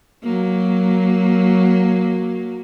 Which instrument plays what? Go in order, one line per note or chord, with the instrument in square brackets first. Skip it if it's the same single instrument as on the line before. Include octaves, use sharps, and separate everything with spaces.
[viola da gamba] F#3 A#3